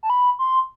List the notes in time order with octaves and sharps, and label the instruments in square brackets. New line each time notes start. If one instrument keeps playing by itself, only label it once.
[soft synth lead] A5
B5
C6